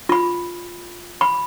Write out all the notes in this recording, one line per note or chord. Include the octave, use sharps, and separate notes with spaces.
F4 B5
B5